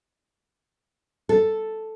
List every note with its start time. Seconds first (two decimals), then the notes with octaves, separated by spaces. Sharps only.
1.29 A4